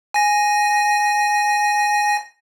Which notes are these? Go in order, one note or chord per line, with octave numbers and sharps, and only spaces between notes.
G#5 A#6